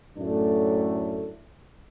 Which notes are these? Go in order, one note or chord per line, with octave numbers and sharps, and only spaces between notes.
F#2 A2 A3 D4